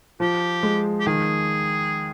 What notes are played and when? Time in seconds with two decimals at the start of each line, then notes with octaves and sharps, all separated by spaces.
0.20 F3 G4
0.63 G#3
1.00 G4
1.06 D#3 G#4